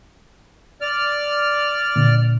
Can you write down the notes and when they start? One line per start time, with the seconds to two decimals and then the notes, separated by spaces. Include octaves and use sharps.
0.81 D5 F6
1.96 A#2 D3